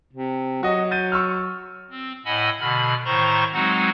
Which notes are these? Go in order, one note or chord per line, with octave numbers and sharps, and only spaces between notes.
C3
F#3 F#4 D#5
G6 A6 D#7
C#6 E6 F6
C4
A2 D#5 F#5 G#5 B5 E6
B2 D3 B5 F6
A2 D#3 C5 A#5 C6 C#6
F#3 G#3 C4 D#4 F#4 F#5